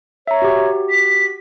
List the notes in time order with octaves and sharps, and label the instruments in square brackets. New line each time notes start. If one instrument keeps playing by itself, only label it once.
[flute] C#5 [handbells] E5 A#5
[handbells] F#4 G4
[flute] B6